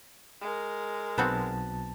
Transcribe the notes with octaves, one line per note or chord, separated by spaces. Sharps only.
G#3 A#4
B1 B3 C4 F#4 A5